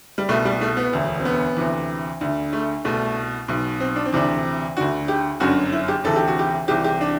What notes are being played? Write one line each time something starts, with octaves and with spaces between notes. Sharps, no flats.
G3
C2 B2 A3
G3
A3
B3
E1 D2 D3
C4
B3
D2 C3 E3
D2 D3
A3
C2 B2 A3
B1 B2
C4
D4
C4
D2 C3 E3 D4
D2 D3 F#4
G4
G1 F#2 D3 F#4
E4
G4
D2 C3 E3 A4
G4
F#4
G4
C2 C3 E3 G4
G4
D4